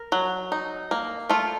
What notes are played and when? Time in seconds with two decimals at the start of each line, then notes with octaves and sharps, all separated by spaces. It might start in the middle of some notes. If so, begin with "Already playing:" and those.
Already playing: A#4
0.12 F#3
0.52 D#4
0.91 A#3
1.29 A3 F4